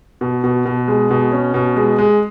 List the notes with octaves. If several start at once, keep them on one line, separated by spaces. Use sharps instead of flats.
B2
B2
B2
G#3
B2
C#4
B2
G#3
G#3